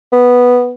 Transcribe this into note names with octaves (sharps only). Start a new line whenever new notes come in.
B3